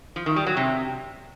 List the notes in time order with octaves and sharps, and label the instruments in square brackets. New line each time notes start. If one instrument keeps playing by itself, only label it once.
[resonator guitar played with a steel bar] F3
D#3
G3
F#3
C3